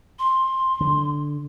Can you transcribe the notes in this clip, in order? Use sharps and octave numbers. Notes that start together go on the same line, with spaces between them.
C6
D3